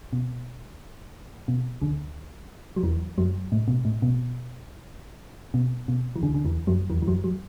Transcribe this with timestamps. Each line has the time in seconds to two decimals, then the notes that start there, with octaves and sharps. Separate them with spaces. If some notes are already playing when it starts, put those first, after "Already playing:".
0.13 B2
1.48 B2
1.82 D2 D3
2.76 F#3
2.83 E2 E3
3.18 F#2 F#3
3.52 A2
3.68 B2
3.85 A2
4.02 B2
5.54 B2
5.88 B2
6.16 E3
6.22 D2 D3
6.34 D3
6.45 E2 E3
6.67 F#2 F#3
6.90 E2 E3
7.02 E3
7.07 F#2 F#3
7.24 F#3